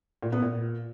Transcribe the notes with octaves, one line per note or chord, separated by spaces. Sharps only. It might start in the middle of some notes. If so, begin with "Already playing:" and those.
A#2
B3
A#2